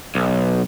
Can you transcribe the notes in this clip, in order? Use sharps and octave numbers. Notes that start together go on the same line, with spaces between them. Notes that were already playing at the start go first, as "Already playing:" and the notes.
B1